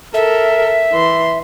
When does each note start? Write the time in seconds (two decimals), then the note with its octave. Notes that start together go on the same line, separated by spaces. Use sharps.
0.14 A4 A#4 E5
0.93 E3 C6